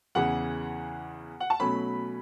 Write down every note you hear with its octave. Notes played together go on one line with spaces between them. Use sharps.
E2 C#3 E3 F#5
F#5
A5
B2 F#3 A3 C#4 B5